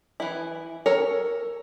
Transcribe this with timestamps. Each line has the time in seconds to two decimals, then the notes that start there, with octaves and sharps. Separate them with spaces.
0.20 E3 E4
0.86 A4 A#4 C#5